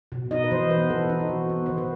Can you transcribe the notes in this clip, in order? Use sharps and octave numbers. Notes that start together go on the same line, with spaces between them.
B2
D#4 D#5
B4
E3 C5
B3 B4
E3 A4
D#4
F#4
E3
B3
D#3 C5
B4